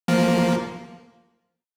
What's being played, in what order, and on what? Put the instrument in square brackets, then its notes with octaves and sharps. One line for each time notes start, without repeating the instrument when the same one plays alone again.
[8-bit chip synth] F3 A#3